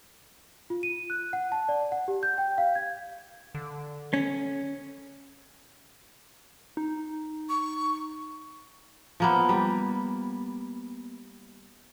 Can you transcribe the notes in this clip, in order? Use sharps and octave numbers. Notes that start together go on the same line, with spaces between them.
F4
D#7
F#6
F#5
A5
D5
F#5
G4
G6
G5
F5
G#6
D3
C#4
D#4
C#6
F3 A#3 B3
G3